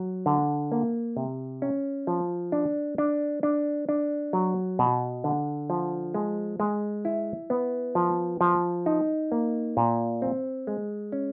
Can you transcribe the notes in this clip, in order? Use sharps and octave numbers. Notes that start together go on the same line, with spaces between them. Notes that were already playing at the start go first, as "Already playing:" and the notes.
Already playing: F#3
D3
A#3
C3
C#4
F3
D4
D4
D4
D4
F#3
B2
D3
F3
G#3
G#3
E4
B3
F3
F3
D#4
A#3
A#2
C4
G#3
C#4